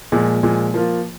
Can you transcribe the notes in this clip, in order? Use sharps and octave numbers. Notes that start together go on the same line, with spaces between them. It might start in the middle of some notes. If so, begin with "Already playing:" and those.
A#2 F3 G#3
A#2 F3 G#3
F3 A#3 F4